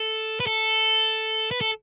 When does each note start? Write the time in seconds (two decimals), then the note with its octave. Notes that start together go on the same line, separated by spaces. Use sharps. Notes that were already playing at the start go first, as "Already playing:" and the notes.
Already playing: A4
0.40 B4
0.47 A4
1.51 B4
1.61 A4